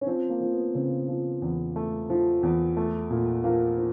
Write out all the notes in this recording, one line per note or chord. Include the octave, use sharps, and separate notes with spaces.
C#4
F3 C4
A#3
F3
B3
C#3 C4
F3
E2
A3
F3
E2
A3
A#2
F3 A#3
F3